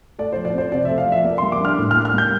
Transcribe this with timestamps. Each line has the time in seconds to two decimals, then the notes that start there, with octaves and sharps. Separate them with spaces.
0.19 A3 D5
0.32 F3 C5
0.45 D5
0.53 C4 C5
0.72 C3 D5
0.85 A3 E5
0.98 F5
1.07 F3 E5
1.24 A#3 D5
1.38 G3 C6
1.52 D6
1.60 D4 F6
1.78 A2
1.91 F6
1.96 A#3
2.05 F6
2.14 G3 G6